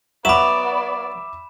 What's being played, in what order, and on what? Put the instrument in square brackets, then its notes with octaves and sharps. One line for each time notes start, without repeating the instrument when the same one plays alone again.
[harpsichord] F#3 [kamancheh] B3 D5 [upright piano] E5 D6 [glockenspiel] B5 E7